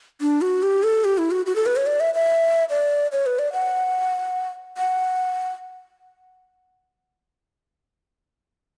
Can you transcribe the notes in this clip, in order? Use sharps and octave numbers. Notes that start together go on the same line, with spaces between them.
D4
F#4
G4
A4
G4
E4
F#4
F#4
A4
B4
C#5
D5
E5
E5
D5
C#5
B4
D5
F#5
F#5